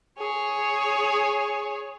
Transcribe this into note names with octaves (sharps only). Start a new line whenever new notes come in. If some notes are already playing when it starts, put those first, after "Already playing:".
G#4 C#5